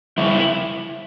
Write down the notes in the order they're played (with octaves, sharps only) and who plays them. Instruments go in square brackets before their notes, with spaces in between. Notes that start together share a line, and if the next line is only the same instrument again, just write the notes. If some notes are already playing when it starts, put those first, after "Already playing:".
[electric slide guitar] F2 C#3 G3 E4